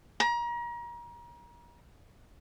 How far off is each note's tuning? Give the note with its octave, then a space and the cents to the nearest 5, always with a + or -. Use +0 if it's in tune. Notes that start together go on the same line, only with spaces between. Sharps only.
A#5 +35